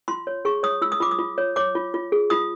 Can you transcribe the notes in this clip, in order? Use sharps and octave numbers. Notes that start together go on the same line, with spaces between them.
F4 C6
C#5
G#4 C#6
C#5 D#6
F4 E6
D#6
F4 D6
D#6
F4
C#5
C#5 D6
F4
F4
G#4
F4 D#6